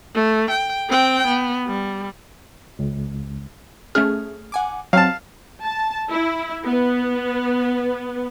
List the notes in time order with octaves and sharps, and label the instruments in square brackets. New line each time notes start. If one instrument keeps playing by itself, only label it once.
[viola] A3
G5
C4 G5
B3
G3
[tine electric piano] C#2
[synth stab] A3 C#4 G#4 [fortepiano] F6
[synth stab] F#5 G#5 D6
[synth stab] F#3 C4 [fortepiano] F5 A5
[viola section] A5
E4
B3